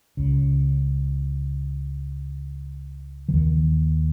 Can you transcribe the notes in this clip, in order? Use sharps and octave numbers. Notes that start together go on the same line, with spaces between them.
C#2 C#3
E3
D#2 D#3